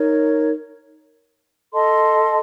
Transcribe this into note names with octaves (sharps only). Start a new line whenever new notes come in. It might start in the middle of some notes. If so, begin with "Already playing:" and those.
Already playing: D#4 A#4 C#5
A4 D#5 A5 C6